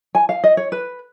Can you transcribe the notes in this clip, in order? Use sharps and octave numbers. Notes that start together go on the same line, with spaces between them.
G#5
F5
D#5
C#5
B4